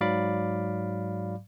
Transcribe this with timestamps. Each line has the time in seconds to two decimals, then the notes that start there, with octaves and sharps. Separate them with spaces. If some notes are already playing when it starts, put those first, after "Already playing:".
0.01 G#2 F#3 D5 F5 B5 D6